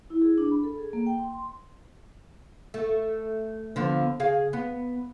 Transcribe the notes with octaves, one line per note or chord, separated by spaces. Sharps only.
E4
G#4
D4
B5
A4
G#4
A#3
G5
C6
C6
A3
D3 F3 B3
C#3 G#4 F5
B3